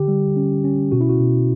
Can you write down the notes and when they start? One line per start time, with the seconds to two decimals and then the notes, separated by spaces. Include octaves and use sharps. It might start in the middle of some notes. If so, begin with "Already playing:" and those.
Already playing: D3 G4
0.08 G3
0.36 C#4
0.64 C#4
0.92 B2 F#4
1.01 E4
1.09 F#4
1.20 B2